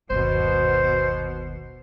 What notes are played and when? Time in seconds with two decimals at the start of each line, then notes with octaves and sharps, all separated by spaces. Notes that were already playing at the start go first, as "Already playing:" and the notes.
0.10 G1 D#2 B2 C5